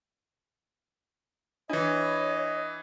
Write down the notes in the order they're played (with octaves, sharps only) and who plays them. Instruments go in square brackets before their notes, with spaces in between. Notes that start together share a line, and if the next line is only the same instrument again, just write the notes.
[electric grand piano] E3 E4 [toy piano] D4 [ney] C#5 [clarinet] D#5